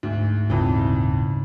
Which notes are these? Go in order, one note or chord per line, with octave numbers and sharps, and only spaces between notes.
D2 G#2
D#1 F2 C#3 E3 C4